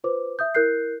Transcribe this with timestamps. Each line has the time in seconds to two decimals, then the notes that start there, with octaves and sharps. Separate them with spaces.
0.04 F4 B4 C5 D6
0.39 E5 D#6 G6
0.55 E4 A#4 F#6 G6 C7